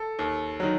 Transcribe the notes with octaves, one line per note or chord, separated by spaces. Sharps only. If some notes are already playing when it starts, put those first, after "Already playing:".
Already playing: A4
D#2
D#3 F#3